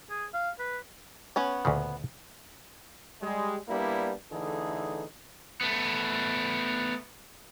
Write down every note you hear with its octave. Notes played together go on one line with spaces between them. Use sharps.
G#4
F5
B4
B3 C#4 C#5
D2 A#2 C#3
G3 G#3
G3 A#3 B3 D4 E4
D3 E3 A3 D#4 G#4
A3 B3